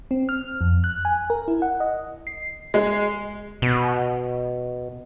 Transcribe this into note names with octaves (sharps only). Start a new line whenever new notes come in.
C4
F6
F2
F#6
G#5
A#4
E4
F#5
D#5
C7
G#3
B2